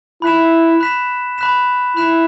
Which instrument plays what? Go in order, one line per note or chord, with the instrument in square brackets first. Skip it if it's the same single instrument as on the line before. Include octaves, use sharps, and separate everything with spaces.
[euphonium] E4 [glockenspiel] B5 F#6 B6 E7
[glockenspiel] B5 F#6 B6 E7
B5 F#6 B6 E7
[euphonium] E4 [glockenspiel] B5 F#6 B6 E7